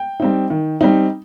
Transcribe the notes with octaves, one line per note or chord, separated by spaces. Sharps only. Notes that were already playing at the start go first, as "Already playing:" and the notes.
Already playing: G5
G3 C4 D#4
D#3
G3 C4 D#4